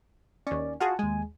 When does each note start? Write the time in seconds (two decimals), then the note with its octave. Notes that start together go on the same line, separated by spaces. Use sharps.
0.47 D#2 C#4 D5
0.80 F4 F#4 G#4 F#5 A5
0.99 D#2 G#3 G#5